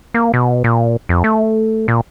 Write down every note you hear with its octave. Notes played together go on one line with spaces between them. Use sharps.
A#3
B2
A#2
F2
A3
A#2